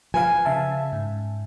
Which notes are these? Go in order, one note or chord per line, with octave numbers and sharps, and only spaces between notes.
F3 B4 F5 G#5
C#3 E5 A5
G#2